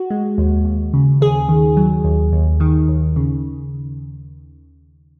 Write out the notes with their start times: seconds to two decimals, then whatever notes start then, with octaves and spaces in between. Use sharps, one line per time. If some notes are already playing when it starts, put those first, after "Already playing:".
Already playing: F#4
0.10 G#3
0.38 D#2
0.65 D#2
0.94 C#3
1.21 D#2 G#4
1.49 D#3
1.77 F#3
2.04 D#2
2.33 D#2
2.60 D#3
2.88 D#2
3.16 C#3